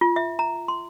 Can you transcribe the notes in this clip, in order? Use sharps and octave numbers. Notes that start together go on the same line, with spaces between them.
F4
E5
A#5
C6